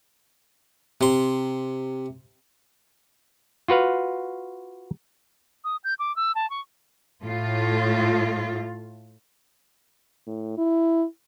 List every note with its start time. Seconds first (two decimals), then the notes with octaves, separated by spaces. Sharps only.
1.01 C3 C6
3.68 F4 F#4 B4 F5
5.64 D#6
5.84 G6
5.99 D6
6.16 E6
6.35 A5
6.50 C#6
7.22 A2 A3 F4
10.27 A2
10.58 E4